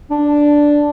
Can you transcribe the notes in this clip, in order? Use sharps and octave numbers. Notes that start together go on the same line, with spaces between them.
D4